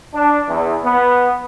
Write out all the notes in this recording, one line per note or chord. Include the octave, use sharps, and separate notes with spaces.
D4
E2
B3